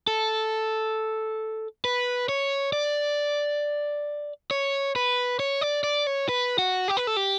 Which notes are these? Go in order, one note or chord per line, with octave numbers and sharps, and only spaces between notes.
A4
B4
C#5
D5
C#5
B4
C#5
D5
D5
C#5
B4
F#4
G4
B4
A4
G4